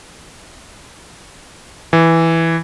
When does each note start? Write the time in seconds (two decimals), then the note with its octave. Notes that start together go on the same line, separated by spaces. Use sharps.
1.93 E3